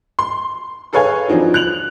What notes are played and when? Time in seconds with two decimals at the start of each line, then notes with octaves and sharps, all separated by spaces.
0.19 C6
0.93 G#4 A4 B4 C#5 F5 G#5
1.28 F3 C4 D4 D#4 F#4
1.54 F#6 F7 F#7